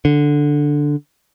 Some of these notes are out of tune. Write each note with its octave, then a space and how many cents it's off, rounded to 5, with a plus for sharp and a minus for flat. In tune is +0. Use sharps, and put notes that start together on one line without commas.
D3 +0